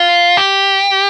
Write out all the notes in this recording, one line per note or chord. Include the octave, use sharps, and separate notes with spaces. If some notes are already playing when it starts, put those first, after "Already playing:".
Already playing: F4
G4